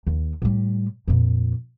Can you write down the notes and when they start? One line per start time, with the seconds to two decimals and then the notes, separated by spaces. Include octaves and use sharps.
0.07 D#2
0.42 A2 G3
1.08 F2 A#2